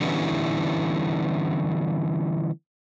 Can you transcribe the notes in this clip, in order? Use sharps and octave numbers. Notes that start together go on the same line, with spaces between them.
D3 E3 G3 B3 C#4 E4